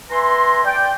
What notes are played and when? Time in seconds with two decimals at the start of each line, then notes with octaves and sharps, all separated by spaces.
0.10 B4 E5 G#5 A#5 C6
0.64 D5 G5